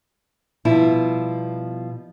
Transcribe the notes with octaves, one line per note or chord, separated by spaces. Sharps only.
B2 F3 G3 E4